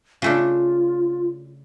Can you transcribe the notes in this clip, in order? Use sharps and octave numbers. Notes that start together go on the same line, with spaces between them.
C#3 A3 D4 F4